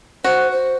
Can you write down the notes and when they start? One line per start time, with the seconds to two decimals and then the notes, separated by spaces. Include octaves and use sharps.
0.24 F#4 C5
0.52 C5